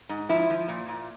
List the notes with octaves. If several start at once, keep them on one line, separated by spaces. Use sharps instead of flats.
G#2
F3 E4
F3
A#2
A#2